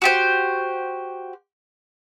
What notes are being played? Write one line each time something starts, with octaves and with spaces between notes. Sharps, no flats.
F#4 G4 C5